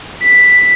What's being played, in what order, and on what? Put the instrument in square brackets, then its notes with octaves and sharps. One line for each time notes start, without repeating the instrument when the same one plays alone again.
[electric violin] B6